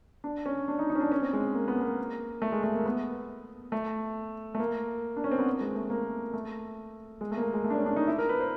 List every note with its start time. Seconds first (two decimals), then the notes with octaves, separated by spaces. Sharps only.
0.24 D4
0.46 C#4
0.68 D4
0.79 D#4
0.90 D#4
0.95 C#4
1.00 D4
1.12 C#4
1.22 C4
1.33 G#3
1.55 A#3
1.68 B3
1.81 A#3
2.42 A3
2.52 G#3
2.63 A3
2.74 A#3
2.85 B3
3.72 A3
4.55 A3
4.59 A#3
5.17 D4
5.24 C#4
5.31 C4
5.39 B3
5.46 A#3
5.61 G#3
5.76 A3
5.90 A#3
6.33 A3
7.21 G#3
7.31 A3
7.37 A#3
7.42 A3
7.54 G#3
7.64 A3
7.70 D4
7.75 C#4
7.86 D4
7.96 D#4
8.07 E4
8.18 A#4
8.29 B4
8.40 C5